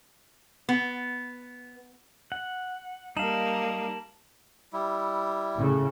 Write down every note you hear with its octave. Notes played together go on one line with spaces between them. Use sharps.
B3
F#5
G3 A#3 D#4 F5 A5 E7 F#7
G3 E4
A2 C#3